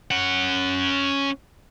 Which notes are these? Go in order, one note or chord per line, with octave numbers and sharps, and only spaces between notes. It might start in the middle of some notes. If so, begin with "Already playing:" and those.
C#4 F#5